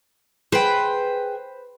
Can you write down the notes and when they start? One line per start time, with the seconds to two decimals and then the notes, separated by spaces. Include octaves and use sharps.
0.52 G#4 B4 C5 G5